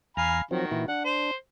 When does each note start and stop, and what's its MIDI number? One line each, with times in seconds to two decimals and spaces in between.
0.17 0.42 40
0.17 0.41 77
0.17 0.41 80
0.17 0.42 82
0.17 0.41 83
0.51 0.85 51
0.51 0.65 53
0.51 0.65 54
0.51 0.65 60
0.51 0.85 66
0.71 0.86 46
0.71 0.86 52
0.71 0.86 64
0.88 1.31 62
0.88 1.05 78
1.05 1.36 72